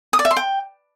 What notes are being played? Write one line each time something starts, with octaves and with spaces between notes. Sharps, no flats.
D#6
D5
E5
C6
G5